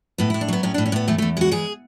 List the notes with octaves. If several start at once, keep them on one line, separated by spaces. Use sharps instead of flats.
A2 B3
A2 E4
D4
F#3 B3
A2 C#4
A2 D4
C#4
A2 B3
E2 A3
E2 A3
G#3 F#4
E2 G#4